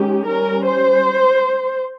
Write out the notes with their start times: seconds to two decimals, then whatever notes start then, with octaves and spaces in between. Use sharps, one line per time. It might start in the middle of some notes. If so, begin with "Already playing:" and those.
Already playing: D#3 G#3 C#4 G4
0.27 G3 C#4 A#4
0.65 C5